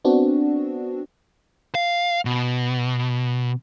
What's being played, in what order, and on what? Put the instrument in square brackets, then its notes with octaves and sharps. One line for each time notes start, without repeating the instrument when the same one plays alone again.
[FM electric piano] B3 C4 D4 F#4
[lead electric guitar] F5
B2